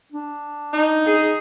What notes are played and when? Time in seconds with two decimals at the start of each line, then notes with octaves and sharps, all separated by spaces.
0.12 D4
0.73 D#4
1.05 G#4